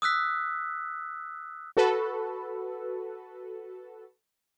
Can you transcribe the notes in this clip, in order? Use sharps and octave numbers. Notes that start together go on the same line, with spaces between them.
D#6 E6 F#6 B6
F#4 A4 B4